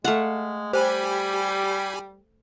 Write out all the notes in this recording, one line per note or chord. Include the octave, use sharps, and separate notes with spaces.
G#3 A3 F5 F#5
G3 G4 C5 G#5 B5